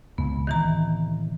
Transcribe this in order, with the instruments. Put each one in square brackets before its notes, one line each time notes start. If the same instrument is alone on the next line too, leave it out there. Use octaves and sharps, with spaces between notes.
[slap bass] C#2 A#2 C#3 [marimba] B3
[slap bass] A2 C3 [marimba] D#3 E3 A#5